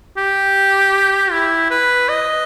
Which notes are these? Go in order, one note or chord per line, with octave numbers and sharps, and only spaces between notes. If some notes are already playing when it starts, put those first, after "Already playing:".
G4
E4
B4
D#5